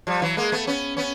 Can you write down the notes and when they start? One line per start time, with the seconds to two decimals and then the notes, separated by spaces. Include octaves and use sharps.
0.07 F3 G3
0.22 E3 F#3
0.37 G#3 A#3
0.52 A3 B3
0.67 B3 C#4
0.97 B3 C#4